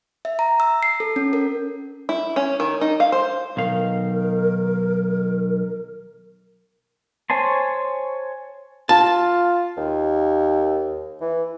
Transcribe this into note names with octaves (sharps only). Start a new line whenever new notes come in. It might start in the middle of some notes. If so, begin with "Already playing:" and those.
E5
A#5
E6
C7
A4
C#4
A#4
E4
C#4
D#3
D#4
F5
C5
B1 D#3 A#4 F5
C5 C#5 G#5 A5 C6
F4 A5
D#2
E3